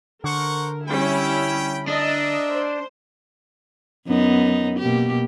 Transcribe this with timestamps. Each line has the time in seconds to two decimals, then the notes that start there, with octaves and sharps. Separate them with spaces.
0.24 D3 A#4 C5 F#5 C#6
0.88 G3 C#4 E4 G5 B5
1.88 D4 A#4 D#5 E5 A5
2.52 C5
4.06 F#2 B3 D#4
4.79 B2 A#3 G4